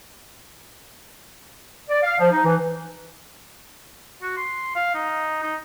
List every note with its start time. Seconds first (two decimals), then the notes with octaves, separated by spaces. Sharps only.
1.90 D5
2.03 F5
2.19 F3
2.31 D#4
2.44 E3
4.22 F#4
4.37 C6
4.75 F5
4.94 D#4
5.43 D#4